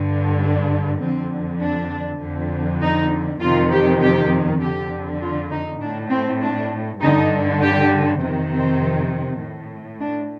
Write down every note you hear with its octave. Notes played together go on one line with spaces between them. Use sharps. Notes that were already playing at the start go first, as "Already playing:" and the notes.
Already playing: G2 D3
D4
F2 D3 C4
D4
F2 D3
D#4
F2 C3 D#3 F4
G4
G4
F2 D3 G4
F4
D#4
A2 D4
C4
D4
G2 D3 D#4
G4
F2 C3 D#3 C4
C4
A2
D4